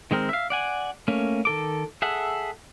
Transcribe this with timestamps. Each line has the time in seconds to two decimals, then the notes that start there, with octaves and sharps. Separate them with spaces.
0.11 D#3 G#3 C4 A#4
0.29 E5 F5
0.50 D5 F#5 G#5
1.08 A3 A#3 C#4
1.45 D#3 A4 D6
2.02 G#4 A4 E5 F#5